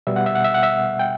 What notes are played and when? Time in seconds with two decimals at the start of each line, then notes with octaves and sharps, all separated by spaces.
0.07 B2 G3 B3 E5
0.16 F#5
0.26 E5
0.35 F#5
0.44 E5
0.54 F#5
0.63 E5
0.99 G5